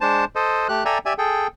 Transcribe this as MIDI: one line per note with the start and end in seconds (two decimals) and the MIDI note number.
0.01 0.25 56
0.01 0.25 62
0.01 0.25 72
0.01 0.25 81
0.35 0.67 69
0.35 0.67 72
0.35 0.67 75
0.69 0.84 57
0.69 0.84 67
0.69 0.84 90
0.85 0.98 69
0.85 0.98 74
0.85 0.98 76
0.85 0.98 79
0.85 0.98 80
0.85 0.98 82
1.06 1.13 67
1.06 1.13 74
1.06 1.13 76
1.06 1.13 80
1.18 1.47 68
1.18 1.47 69
1.18 1.47 79